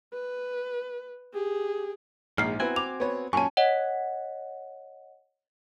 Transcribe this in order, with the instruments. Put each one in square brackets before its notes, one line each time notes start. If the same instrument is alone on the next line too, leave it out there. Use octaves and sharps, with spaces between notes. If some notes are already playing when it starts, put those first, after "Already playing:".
[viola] B4
G4 G#4
[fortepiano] A#1 [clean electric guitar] G#2 [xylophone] F6 C7
[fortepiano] B3 E4 [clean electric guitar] C4 F#4 G#5
[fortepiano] D6 [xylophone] F7
[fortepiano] B3 C#5
[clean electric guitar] F#2 A#2 [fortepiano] C#4 C#6 [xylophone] G#5 A5
[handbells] C#5 D#5 F#5